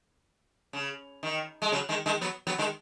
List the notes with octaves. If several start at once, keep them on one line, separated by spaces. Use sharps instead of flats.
C#3
D#3
G#3
C#3 F#3
D#3 G#3
D#3 G#3
F#3 B3
F#3 B3
D#3 G#3